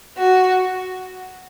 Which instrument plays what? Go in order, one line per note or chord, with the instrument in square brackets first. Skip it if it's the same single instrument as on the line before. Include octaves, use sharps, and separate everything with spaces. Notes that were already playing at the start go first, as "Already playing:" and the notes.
[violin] F#4